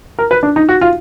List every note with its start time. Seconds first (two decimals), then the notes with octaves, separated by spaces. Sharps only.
0.19 A#4
0.31 B4
0.43 D4
0.56 D#4
0.69 F#4
0.81 F4